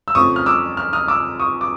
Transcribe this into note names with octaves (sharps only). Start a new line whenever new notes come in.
E6
F2 C#3 F3 A3 C4 C#6 D#6
F6
D6 E6
F6
D#6 F6
D6 E6
C#6 D#6
D6